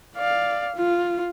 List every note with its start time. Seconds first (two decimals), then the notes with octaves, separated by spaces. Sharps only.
0.16 D5 F5
0.76 F4